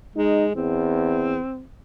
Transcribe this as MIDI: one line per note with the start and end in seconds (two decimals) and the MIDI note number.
0.16 0.51 56
0.16 0.46 63
0.55 1.38 40
0.55 1.63 60